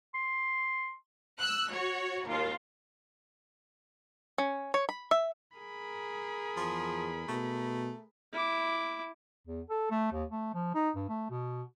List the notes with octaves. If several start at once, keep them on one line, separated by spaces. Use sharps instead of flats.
C6
E6 F#6
F#4 C#5
D#2 F4
C#4
C#5
B5
E5
G#4 A#4 B5
E2 F3
B2 A3
E4 D6
E2
A4
A3
D#2
A3
F3
D#4
G2
A3
B2